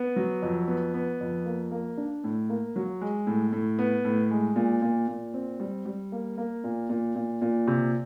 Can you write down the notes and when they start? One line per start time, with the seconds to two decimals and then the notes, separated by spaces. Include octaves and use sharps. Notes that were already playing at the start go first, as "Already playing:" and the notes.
Already playing: B3
0.16 F#3
0.42 F2
0.68 B3
0.94 B3
1.21 F2
1.46 A#3
1.71 A#3
1.97 D4
2.24 A2
2.50 A#3
2.76 F#3
3.01 G#3
3.27 A2
3.53 A2
3.79 B3
4.05 A2
4.31 G#3
4.56 A#2
4.82 A#2
5.08 A#2
5.34 C4
5.60 G3
5.85 G3
6.12 A#3
6.38 A#3
6.64 A#2
6.89 A#2
7.15 A#2
7.42 A#2
7.67 C3